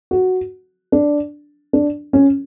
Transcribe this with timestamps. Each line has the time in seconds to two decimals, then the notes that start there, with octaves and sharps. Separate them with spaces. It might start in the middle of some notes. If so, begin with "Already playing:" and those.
0.11 F#4
0.92 D4
1.73 D4
2.13 C#4